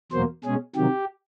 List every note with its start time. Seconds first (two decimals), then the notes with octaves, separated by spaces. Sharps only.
0.12 E2 B2 F#3 A#3 C5
0.44 B2 G#3 C#4 G#4
0.76 C3 D#3 F#3 G4